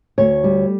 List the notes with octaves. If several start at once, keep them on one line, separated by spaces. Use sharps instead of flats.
D2 C#5
G3